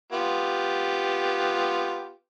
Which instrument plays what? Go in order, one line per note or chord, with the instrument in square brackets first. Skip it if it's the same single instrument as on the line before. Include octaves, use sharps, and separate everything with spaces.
[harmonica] B3 F4 G4